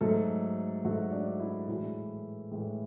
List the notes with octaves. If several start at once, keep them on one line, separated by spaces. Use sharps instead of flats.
G#2 F#3 A3 A4
G#2 F#3 A3 F#4
D4
E4
A2 E3 G#3 E4
A2 E3 G#3